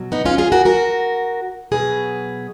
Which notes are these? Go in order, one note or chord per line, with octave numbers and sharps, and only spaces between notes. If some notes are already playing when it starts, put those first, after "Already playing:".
Already playing: B2 F#3
B3 D#4
C#4 F4
F4 G#4
F#4 A#4
F#4 A#4
B2 F#3 G#4 B4